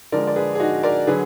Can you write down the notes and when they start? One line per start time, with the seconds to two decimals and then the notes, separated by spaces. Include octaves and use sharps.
0.12 D3 F3 G#3 A#4 D5
0.27 D5
0.36 G#4 B4
0.55 G#4
0.60 D#4 F#4
0.83 A#4 D5
1.07 D3 F#3 G#4 B4